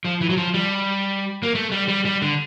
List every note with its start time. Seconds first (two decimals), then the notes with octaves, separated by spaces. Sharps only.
0.05 F3
0.21 E3
0.30 F#3
0.37 F3
0.54 G3
1.43 A#3
1.55 A3
1.72 G3
1.88 G3
2.05 G3
2.22 D3